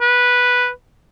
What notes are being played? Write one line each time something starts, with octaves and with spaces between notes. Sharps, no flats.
B4